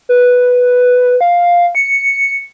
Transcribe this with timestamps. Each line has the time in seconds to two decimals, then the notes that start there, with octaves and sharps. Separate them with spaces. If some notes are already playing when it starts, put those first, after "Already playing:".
0.09 B4
1.21 F5
1.75 C#7